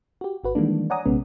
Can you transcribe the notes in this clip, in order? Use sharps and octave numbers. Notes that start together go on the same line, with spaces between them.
F#4 G4
G#1 F#4 B4
D#3 E3 G3 G#3 A#3 D4
C#5 D5 F#5 G#5 A#5 D#6
A#1 C3 G#3 B3 C#4